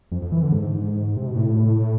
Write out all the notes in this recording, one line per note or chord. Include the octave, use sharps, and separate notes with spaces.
F2
F2
E3
D3
G#2
C3
B2
A2